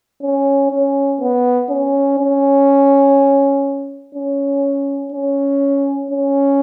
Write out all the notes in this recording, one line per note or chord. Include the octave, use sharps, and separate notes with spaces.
C#4
C#4
B3
C#4
C#4
C#4
C#4
C#4